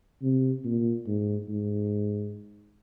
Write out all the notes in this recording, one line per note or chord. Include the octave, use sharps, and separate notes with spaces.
C3
A#2
G#2
G#2